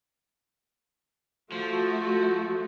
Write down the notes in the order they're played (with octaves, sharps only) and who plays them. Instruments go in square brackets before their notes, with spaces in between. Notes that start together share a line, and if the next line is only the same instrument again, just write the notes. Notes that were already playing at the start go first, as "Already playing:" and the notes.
[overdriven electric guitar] F3 [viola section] A3 F#4